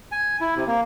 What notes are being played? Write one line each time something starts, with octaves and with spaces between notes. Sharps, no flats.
G#5
E4
C3
A#3